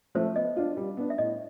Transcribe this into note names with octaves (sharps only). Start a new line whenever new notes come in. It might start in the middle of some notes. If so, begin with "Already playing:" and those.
F3 A3 C5
B3 D#5
D4 F4
G3
B3 D4
E5
A2 D#5